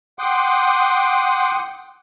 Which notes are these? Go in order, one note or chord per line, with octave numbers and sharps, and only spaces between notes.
F#5 G5 C6 D6 D#6